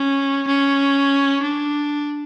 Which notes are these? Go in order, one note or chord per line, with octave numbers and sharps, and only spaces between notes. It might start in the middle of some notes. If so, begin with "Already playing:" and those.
Already playing: C#4
C#4
D4